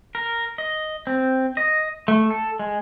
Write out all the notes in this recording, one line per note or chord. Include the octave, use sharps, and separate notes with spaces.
A#4
D#5
C4
D#5
A3
A4
G#3